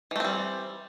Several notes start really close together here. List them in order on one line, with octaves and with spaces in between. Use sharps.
E3 A3 C4 G3